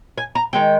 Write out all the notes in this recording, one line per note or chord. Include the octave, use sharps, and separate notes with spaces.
G#5
A#5
D#3 G#3 G5